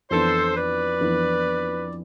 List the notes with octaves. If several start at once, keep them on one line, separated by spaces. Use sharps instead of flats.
F2 E3 B3 D4 A4 C5
B4 D5
F2 E3 B3 D4